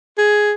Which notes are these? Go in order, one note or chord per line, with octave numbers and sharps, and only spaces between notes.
G#4